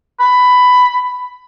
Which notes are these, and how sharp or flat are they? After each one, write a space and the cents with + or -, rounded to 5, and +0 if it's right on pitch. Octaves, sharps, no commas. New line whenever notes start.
B5 +10